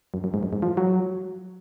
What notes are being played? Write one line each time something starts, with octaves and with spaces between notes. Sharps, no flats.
F#2
F#2
G#2
F#2
G#2
F3
F#3